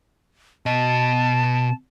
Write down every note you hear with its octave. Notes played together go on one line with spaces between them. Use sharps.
B2 D#5 A5